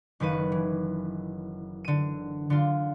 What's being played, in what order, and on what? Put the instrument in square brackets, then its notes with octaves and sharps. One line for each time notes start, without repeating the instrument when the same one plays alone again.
[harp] F#1 D#3 B4 D#7
E3
D3 D#7
D3 F4